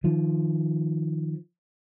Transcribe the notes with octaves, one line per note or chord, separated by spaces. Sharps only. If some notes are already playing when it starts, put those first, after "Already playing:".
D#3 F3